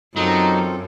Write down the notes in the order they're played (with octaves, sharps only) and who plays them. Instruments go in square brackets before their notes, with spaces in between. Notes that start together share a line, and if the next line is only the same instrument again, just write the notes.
[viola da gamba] F#2 [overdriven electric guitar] F#3 [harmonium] C4 F4 A4 [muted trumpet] D#4